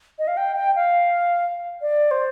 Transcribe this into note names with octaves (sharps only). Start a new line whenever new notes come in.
D#5
F5
G5
G5
F5
D5
C5